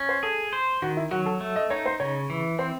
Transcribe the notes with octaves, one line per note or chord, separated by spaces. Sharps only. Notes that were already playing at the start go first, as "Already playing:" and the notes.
Already playing: C#4
C5
G#4 A4
C5
D#3 F#4
E4
F#3 F#4
A4
A3
D#5
D#4 C#5
C5
C#3 C#5
E3
C4 C5